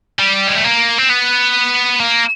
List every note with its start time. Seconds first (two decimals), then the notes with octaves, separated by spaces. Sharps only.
0.19 G3
0.47 G#3
0.56 A3
0.64 A#3
0.98 C4
1.10 B3
2.00 A#3